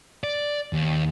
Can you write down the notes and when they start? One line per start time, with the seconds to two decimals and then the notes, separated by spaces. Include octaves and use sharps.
0.24 D5
0.73 D#2